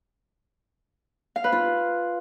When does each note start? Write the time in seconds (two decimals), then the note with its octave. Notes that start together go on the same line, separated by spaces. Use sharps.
1.36 F5
1.44 B4
1.52 F4